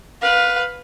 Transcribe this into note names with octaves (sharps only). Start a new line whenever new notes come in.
B4 F5